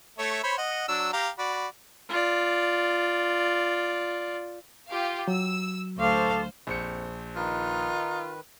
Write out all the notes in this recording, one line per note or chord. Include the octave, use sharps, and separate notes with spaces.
A3 C#5 E5
C5 C#5 B5
D#5 F#5
F#3 D4 E6
G4 F5 A#5
F#4 D5 B5
F4 D5
F4 G4 F5
F#3 E6
D2 A4 C5 F5 C#6 D6
A#1 F2 C5 C#7
D#3 D#4 F4 B4